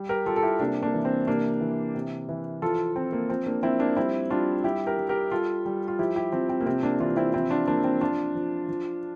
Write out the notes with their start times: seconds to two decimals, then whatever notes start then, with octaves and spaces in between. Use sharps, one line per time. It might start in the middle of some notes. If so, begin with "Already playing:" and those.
Already playing: G3
0.09 G4 A#4
0.26 G3 F4 A4
0.36 A4
0.43 E4 G4
0.60 C3 A#3 D4
0.82 A#3 D4
0.94 E3
1.05 C4
1.27 C3 A#3 D4
1.61 E3
1.95 C3
2.29 E3
2.62 F3 F4 A4
2.95 F3 C4
3.12 A#3
3.29 F3 C4
3.46 A#3 D4
3.63 F3 C4 E4
3.80 A#3 D4
3.96 G3 C4 E4
4.30 G3 D4 F4
4.64 G3 E4 G4
4.87 G4 A#4
4.98 G3
5.09 G4 A#4
5.31 G3 F4 A4
5.66 G3
5.88 F4
5.99 F3 E4 G4
6.16 E4 G4
6.32 F3 C4
6.49 C4
6.60 A#3
6.66 C3 C4
6.83 A#3 D4
7.00 E3 D4 F4
7.17 C4 E4
7.34 F3 C4 E4
7.50 D4 F4
7.67 F3 A#3 D4
7.84 C4
8.01 F3 D4 F4
8.35 F3
8.69 F3